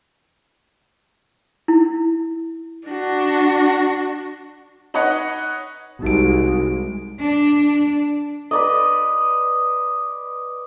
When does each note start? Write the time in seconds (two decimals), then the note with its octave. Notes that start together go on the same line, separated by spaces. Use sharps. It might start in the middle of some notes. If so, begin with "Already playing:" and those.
1.68 E4
2.87 D4 F#4
4.94 D#4 B4 C#5 D#5 F#5
6.02 C2 G#3 D#4 F#4 D7
7.20 D4
8.51 B4 D5 D#5